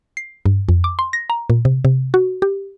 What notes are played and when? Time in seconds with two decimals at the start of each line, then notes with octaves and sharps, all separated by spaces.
0.17 C7
0.46 G2
0.69 F2
0.84 D6
0.99 C6
1.13 A#6
1.30 A#5
1.50 A#2
1.65 C3
1.85 C3
2.14 F#4
2.42 G4